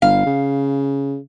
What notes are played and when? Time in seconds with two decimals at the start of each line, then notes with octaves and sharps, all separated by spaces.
0.02 G1 F5
0.26 C#3